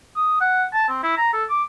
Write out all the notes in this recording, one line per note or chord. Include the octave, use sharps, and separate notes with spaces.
D#6
F#5
A5
C4
E4
A#5
A4
D6